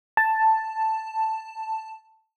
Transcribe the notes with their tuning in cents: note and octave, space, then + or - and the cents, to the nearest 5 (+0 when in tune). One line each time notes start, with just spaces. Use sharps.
A5 +5